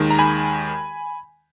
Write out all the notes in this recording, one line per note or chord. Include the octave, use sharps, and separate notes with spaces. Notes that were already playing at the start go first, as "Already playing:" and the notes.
Already playing: D#2 D#3 G#3
A#5
G#5 B5